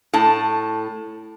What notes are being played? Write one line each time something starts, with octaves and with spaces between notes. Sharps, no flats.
A2 A5